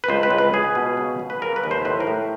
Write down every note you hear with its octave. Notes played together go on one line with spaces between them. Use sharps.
B4
C#2 C5
B4
C#2
B4
C#2 G#4
B2
C#3
C#3
B4
C#3 A#4
B4
D#2
C5
A2 B4
A#4
A2